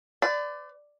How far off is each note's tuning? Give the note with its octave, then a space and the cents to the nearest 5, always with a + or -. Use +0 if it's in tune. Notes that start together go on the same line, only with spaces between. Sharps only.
B4 +45 D5 +0